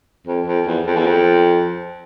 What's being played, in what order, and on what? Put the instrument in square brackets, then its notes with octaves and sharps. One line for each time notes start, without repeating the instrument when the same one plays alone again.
[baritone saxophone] F2
F2
E2
F2
E2
F2